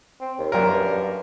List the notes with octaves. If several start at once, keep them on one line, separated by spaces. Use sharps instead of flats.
C4
D#2
F#2 A#2 A#4
G2